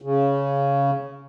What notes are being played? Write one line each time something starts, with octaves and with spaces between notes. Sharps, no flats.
C#3